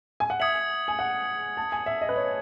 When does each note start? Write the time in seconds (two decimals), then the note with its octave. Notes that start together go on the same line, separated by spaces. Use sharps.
0.20 G#5
0.30 F#5
0.40 E5 D#6 G#6 C#7 F#7
0.88 G#5
0.99 F#5
1.57 A5
1.72 G#5
1.86 E5
2.01 D#5
2.09 B4
2.16 C#5